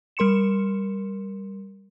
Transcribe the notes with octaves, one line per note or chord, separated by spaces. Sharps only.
G3 A#4 C6 C#7 E7